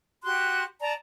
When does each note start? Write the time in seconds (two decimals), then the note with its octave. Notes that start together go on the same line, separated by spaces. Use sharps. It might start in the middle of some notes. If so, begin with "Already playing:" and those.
0.23 F#4 G4 C6 F#6
0.80 D5 A5 A#5